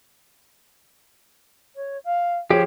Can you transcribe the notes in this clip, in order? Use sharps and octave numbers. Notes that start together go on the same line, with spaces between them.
C#5
F5
F3 G4 G#4 C#5